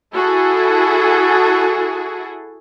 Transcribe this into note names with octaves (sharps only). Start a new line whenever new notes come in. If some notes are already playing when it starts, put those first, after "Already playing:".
E4 F#4 G#4 A4